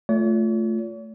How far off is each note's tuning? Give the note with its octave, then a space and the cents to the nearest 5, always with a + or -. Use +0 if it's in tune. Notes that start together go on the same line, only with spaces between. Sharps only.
A3 +0 F4 +0 C#5 +45